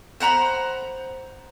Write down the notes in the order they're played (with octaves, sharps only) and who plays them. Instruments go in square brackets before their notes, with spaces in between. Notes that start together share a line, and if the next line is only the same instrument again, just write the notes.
[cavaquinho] C5 F#5 A#5 B5